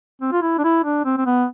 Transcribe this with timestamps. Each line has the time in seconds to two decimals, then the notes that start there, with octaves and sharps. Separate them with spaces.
0.22 C4
0.32 F4
0.42 E4
0.58 D4
0.64 E4
0.84 D4
1.05 C4
1.17 C4
1.26 B3